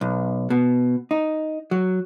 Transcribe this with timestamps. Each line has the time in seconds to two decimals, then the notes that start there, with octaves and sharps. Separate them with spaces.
0.01 B1
0.50 B2
1.11 D#4
1.71 F#3